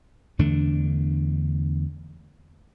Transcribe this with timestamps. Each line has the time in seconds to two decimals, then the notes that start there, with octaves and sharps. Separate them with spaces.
0.39 E2 D3 A3 D4